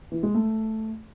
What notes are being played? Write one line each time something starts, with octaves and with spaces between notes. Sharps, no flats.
E3
G#3
A3